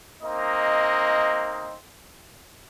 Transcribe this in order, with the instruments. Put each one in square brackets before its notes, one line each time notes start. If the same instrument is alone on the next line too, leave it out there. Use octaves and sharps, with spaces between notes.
[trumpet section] A#3 C4 D#4 D#5